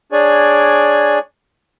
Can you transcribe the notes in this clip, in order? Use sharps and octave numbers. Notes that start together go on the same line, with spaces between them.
D4 G#4 C#5 D5 G#5